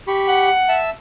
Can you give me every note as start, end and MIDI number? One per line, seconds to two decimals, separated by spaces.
0.07 0.49 67
0.07 0.49 83
0.07 0.49 85
0.28 0.80 78
0.69 0.90 76
0.69 0.90 81
0.69 0.90 88